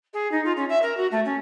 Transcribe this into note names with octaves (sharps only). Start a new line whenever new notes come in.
G#4
D#4
F4
C#4
E5
A#4
F#4
A3
C#4